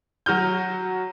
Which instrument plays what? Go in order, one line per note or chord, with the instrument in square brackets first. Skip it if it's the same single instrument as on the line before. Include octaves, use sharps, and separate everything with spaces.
[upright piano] F#3 F#4 F6 G6